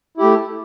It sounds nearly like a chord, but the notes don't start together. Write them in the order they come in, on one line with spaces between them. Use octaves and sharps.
E4 G4 A3